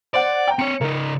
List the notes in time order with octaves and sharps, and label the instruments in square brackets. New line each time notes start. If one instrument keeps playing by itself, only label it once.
[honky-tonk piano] C5 F#5 [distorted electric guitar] D5
[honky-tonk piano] G5 A#5
[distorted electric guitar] C4 C#5 [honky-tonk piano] C#7
[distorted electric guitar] C#3 D#4 [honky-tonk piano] A#4